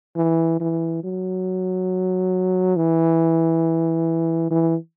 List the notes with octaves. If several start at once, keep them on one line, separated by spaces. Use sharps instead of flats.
E3
E3
F#3
E3
E3